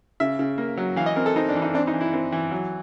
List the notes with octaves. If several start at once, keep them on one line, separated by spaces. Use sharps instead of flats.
C#3 E5
C#3
A#3
F#3
E3 F5
D#5
C4 A#4
A4
C4 D#4
D4
E3
D#4
C4 D4
D#4
E3
E4
C4
E3
F#3